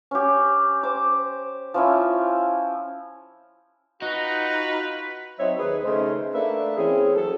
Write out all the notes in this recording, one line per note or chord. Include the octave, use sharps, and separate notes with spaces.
C#4 G4
C5 D6
F3 C#4 E4
D#4 F4 F#4 B4
F#3 C4 D#4 C#5 E5
D#2 G#4 B4
C#3 A3 D#4 C5
A3 A#3 D4 B4 E5
E3 C4 C#4 G#4
F#3 A4